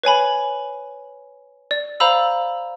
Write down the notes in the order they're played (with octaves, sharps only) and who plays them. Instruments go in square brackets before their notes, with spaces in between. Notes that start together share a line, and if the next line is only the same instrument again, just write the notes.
[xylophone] B4 C#5 G#5 B5
D5
C5 F5 A#5 B5 E6